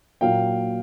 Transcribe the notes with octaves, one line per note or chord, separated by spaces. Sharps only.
A#2 F#3 A#3 F5 G5